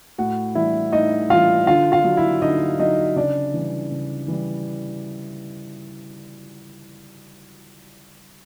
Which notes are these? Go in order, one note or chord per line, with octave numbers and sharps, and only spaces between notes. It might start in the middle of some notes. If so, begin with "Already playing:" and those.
A2 F#4 F#5
E3 G3 E4 E5
A2 D#4 D#5
E3 G3 F4 F5
D3 F4 F5
F4 F5
F#3
E4 E5
D3 D#4 D#5
F#3 D#4 D#5
C#3 D4 D5
E3 G3
C#3
E3 G3